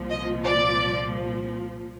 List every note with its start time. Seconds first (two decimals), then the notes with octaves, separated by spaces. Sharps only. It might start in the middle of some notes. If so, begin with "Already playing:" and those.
Already playing: C2 A#2 F3
0.10 D#5
0.45 D5